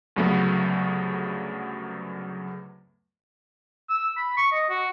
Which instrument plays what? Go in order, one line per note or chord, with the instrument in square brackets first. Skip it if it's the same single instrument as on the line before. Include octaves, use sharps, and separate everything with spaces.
[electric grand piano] D2 G2 C#3 F#3 A3 B3
[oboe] E6
B5
C#6
D#5
F#4